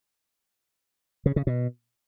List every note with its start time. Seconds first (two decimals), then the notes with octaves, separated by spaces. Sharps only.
1.26 C#3
1.36 C#3
1.47 B2